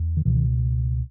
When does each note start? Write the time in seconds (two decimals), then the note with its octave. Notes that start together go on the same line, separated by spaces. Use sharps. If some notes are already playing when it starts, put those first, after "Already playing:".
Already playing: E2
0.17 D#3
0.25 C#2 B2 E3
0.35 D#3